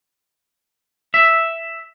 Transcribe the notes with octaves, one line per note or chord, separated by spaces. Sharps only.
E5